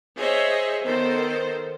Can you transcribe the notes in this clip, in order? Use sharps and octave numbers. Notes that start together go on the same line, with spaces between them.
G#4 C5 C#5 D#5 E5
D#3 B3 A4 C5